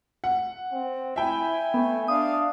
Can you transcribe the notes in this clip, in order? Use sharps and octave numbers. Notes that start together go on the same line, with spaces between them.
F#5
C4
E4 E5 G5 G#5
A3 B3
D4 F5 D#6